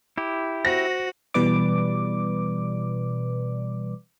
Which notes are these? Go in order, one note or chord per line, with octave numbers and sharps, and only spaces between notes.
E4 G4
F#4 C5 A#6
B2 E3 G3 B4 D5 D6